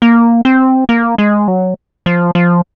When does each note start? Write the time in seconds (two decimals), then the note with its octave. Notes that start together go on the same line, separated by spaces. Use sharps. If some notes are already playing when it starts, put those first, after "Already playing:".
0.02 A#3
0.45 C4
0.89 A#3
1.18 G#3
1.48 F#3
2.06 F3
2.35 F3